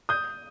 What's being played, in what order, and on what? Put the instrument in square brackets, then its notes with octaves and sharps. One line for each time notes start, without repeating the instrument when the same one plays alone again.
[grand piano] D#6 G6